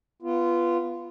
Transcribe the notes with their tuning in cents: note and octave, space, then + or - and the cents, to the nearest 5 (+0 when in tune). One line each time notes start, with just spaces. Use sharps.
B3 +0 F4 -20